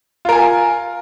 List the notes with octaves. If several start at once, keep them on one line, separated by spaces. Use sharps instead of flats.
F4 A#4 G#5